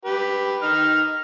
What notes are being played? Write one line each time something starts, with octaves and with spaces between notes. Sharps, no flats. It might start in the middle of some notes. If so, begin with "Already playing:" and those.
G4 B4
D#4 F6